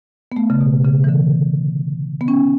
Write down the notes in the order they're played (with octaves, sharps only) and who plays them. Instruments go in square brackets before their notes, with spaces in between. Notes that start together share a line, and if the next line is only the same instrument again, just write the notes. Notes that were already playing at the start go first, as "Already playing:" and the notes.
[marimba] B3
A3
C#3
B2
C#3
E3
D3
B3
C#4